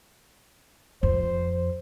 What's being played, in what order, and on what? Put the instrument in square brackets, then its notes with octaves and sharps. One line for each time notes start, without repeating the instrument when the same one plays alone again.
[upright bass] F2 [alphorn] C5